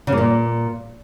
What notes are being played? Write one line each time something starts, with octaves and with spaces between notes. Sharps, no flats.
C#3
A#3
A#2